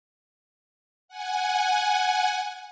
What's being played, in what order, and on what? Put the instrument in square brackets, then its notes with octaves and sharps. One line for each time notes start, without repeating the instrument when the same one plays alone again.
[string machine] F#5 G#5